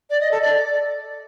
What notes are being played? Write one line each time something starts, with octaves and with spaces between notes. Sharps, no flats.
D5
D#5
A4
D5